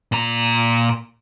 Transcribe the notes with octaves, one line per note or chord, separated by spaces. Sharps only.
A#2 A#5